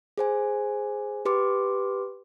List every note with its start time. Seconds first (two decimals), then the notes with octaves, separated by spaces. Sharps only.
0.18 G#4 C5 G#5
1.25 G4 B4 C6 D6